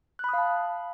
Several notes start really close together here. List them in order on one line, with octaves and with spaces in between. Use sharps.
F#6 B5 D#6 F5 A5